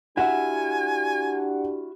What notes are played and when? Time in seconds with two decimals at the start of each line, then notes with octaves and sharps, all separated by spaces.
0.17 D4 E4 F#4 G4 E5 F#5 G#5